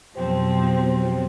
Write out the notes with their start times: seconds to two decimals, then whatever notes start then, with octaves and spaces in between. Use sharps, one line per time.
0.14 F2 B2 F3 F#3 C4 G4 C5 G5